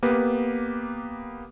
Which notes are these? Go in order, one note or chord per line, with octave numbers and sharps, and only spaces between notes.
A#3 B3 G4 B4